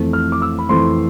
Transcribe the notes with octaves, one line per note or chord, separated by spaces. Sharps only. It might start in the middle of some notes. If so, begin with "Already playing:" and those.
Already playing: F2 E3 A3 C4
F6
D6
E6
B5
F2 E3 A3 C4 C6